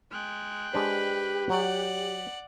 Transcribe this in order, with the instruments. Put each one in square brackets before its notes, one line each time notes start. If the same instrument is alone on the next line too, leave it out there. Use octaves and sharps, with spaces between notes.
[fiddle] G#3 [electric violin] G5 F#6
[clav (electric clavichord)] G#3 D4 C5 [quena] G4 [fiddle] B4
[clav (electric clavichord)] F#3 [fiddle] D5 F#5